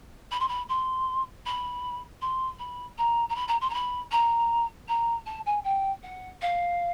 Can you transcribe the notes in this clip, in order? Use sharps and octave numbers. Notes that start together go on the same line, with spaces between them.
B5
C6
B5
C6
B5
C6
B5
A#5
A#5
B5
A#5
C6
A#5
B5
A#5
A#5
A5
G#5
G5
F#5
F5